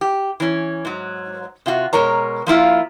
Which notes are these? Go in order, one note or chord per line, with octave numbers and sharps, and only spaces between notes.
G4
E3 C#4
G#2 F#3
C3 F4 F#4
B2 G#3 A#4 C#5 A#5
F3 A#3 E4 F4